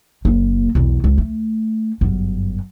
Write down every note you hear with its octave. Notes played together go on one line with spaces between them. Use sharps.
F#1 A#3
B1 E2
C#2
A3
G1 F#2